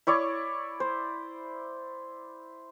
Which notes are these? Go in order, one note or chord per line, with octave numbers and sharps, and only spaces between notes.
E4 C#5 D5 C#6
C5